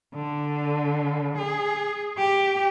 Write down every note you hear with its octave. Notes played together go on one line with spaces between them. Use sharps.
D3
G#4
G4